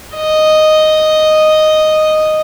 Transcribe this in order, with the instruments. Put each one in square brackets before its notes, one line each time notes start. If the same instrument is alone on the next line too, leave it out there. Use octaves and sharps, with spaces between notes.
[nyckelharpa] D#5